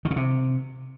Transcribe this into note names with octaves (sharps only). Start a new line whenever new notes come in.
D#3
C#3
C3